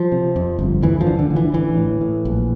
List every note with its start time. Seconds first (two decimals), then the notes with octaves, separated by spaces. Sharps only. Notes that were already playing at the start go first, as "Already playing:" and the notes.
Already playing: F3
0.12 C3
0.36 F2
0.59 G1
0.82 D2 E3
1.01 F3
1.07 D3
1.19 D3
1.30 D3
1.36 E3
1.53 A1 E3
1.77 A2
2.01 A2
2.25 A#1